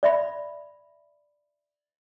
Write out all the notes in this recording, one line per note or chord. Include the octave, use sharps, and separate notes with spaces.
D5 E5 B5